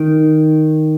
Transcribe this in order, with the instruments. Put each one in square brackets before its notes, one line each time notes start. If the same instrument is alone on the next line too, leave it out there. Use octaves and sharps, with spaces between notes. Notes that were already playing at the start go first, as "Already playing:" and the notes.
Already playing: [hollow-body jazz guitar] D#3